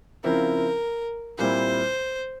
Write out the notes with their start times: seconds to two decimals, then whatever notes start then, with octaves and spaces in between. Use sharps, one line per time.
0.24 C#3 F3 C4 E4 A#4
1.38 A#2 G3 C4 E4 C5